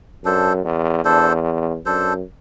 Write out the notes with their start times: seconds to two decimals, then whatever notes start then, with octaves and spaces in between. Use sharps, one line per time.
0.25 F#2 D4 A4 C5
0.64 E2
1.04 E2 D4 A4 C5
1.86 F#2 D4 A4 C5